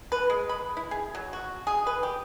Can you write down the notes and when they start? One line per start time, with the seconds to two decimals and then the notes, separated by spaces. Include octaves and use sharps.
0.12 B4
0.30 G#3
0.49 B5
0.77 E4
0.91 G#4
1.15 F#3
1.33 F#4
1.67 G#4
1.87 B4
2.03 G4